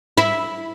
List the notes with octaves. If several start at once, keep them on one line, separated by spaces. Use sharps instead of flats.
E4